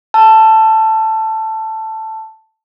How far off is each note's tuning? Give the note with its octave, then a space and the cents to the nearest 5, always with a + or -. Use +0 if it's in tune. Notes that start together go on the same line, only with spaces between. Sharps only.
A5 +5 E6 +35